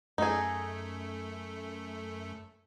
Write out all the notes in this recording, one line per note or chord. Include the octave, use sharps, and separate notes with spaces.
F#2 A3 D#4 G#4 A4